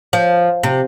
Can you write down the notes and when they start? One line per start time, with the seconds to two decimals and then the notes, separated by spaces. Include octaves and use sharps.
0.13 F3
0.63 C3